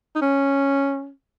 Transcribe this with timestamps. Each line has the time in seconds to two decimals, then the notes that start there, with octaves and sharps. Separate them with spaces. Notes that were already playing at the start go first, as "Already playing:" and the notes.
0.15 D#4
0.21 C#4